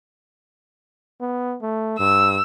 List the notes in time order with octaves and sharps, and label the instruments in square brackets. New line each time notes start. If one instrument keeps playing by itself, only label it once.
[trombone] B3
A3
[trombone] G2 [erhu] E6